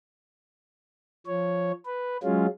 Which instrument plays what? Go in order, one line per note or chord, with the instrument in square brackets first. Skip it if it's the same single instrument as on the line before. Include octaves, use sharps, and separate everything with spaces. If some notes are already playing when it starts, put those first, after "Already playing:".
[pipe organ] F3 C#5
B4
F#3 G#3 C#4 F4